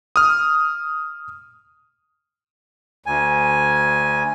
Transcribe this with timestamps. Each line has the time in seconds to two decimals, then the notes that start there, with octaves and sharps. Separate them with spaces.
0.16 D#6 F6
3.06 D2 G#5